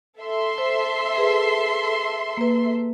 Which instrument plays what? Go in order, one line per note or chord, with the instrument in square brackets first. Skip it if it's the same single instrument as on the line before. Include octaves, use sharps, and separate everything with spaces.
[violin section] A4 E5 C6
[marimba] C5
G#4 B4
A#3 B4